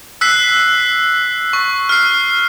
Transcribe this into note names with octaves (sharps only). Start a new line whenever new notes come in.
E6 F#6 B6 C7
C#6
F6 C7